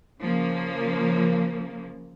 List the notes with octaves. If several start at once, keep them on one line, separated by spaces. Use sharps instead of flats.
C#3 F3 A#3